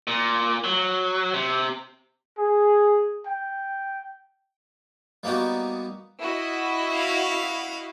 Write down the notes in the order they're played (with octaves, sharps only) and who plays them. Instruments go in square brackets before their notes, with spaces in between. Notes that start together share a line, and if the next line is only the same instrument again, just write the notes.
[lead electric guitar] A#2
F#3
C3
[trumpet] G#4
G5
[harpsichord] G3 A#3 B3 D#4 F#4
[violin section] E4 F#4 D#5
[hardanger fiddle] F5